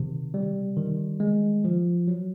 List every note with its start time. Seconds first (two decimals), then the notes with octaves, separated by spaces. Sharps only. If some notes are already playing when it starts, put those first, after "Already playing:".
Already playing: C3 D#3
0.34 G3
0.77 D#3
1.20 G#3
1.64 F3
2.07 F#3